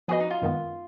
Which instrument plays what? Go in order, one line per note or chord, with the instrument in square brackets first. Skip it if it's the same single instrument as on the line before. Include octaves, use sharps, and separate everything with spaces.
[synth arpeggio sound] F3 B3 F#4 B4 D#5 [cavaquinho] G#4
[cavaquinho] D#4
F4
[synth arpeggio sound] F#2 D#3 G#3 B3